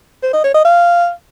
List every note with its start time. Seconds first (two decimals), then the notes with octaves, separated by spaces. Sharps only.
0.23 C5
0.33 D#5
0.44 C#5
0.54 D#5
0.65 F5